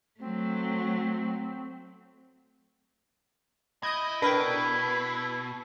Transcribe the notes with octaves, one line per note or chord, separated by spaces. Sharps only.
F#3 A3 C4
E4 D#5 D#6 G6 G#6
B2 D4 E4 A#4 B4 G5